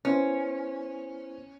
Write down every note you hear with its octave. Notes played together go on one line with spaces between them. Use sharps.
B3 C#4 E4 C5